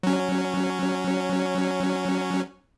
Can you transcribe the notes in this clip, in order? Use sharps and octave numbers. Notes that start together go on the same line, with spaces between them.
F#3 C#4